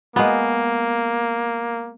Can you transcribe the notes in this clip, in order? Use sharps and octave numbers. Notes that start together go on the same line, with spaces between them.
G#3 A#3 B3